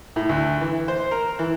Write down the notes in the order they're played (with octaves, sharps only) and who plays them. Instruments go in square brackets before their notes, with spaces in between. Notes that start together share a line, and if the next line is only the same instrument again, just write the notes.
[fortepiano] A2
D2
E3
C5
A#4
E3